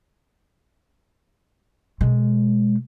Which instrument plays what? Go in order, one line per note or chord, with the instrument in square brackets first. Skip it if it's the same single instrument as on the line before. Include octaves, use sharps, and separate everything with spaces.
[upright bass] B2 G#3